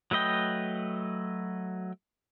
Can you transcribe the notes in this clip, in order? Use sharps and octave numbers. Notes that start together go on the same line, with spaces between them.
F#3 A3 B4 D#5 G5